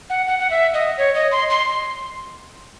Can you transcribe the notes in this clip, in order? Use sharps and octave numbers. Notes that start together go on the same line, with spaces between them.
F#5
F#5
F#5
E5
D#5
C#5
D#5
C6
C6